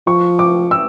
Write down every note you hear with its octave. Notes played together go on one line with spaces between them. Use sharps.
F3 C#6
D6
E6